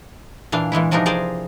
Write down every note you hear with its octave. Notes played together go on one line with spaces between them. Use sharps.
A#2 E3 D4 F5
A#2 E3 G#3 E4
C3 E3 F3 D4 D#4 A#4
G#4 A#4 C5 D5